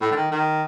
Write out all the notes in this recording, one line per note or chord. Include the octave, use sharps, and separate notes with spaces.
A2
D3
D#3
D#3